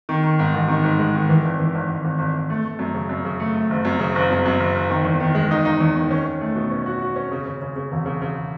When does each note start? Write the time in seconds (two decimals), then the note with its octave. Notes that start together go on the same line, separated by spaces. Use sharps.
0.09 D#3
0.24 D#3
0.39 G#2
0.54 A1
0.68 D#3
0.84 G#2
0.98 G#3
1.14 D#3
1.29 E3
1.45 G#1
1.59 E3
1.75 G#1
1.90 G#1
2.04 G#1
2.19 G#1
2.35 G#1
2.50 A3
2.65 A3
2.79 F#2
2.94 C#3
3.09 F#2
3.25 C#3
3.40 A3
3.55 A3
3.70 F#1
3.85 F#2
3.99 C#3
4.16 F#1
4.30 F#2
4.46 F#2
4.60 F#1
4.75 F#1
4.90 D#3
5.05 E2
5.20 D#3
5.35 G#3
5.51 D#4
5.65 D#4
5.80 E2
5.96 D#3
6.11 C#4
6.25 C#4
6.41 A3
6.55 B2
6.71 C#4
6.86 F#4
7.01 F#4
7.16 C#4
7.31 C#3
7.46 C#3
7.62 C#3
7.76 C#3
7.92 E1
8.06 C#3
8.22 C#3